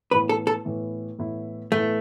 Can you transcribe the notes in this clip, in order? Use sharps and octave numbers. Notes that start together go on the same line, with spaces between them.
A2 E3 B3 E4 B4
A4
A4
A2 E3 B3 E4
A2 E3 B3 E4
A2 E3 A3 B3 E4